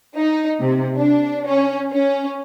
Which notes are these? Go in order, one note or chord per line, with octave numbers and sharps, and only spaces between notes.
D#4
C3
D4
C#4
C#4